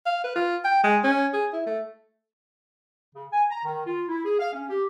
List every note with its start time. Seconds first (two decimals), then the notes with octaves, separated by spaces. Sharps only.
0.06 F5
0.24 B4
0.36 F4
0.64 G5
0.84 G#3
1.04 C#4
1.33 G#4
1.53 E4
1.66 A3
3.15 C#3
3.33 G#5
3.51 A#5
3.64 D#3
3.87 F4
4.08 E4
4.25 G#4
4.39 F5
4.53 C#4
4.70 G4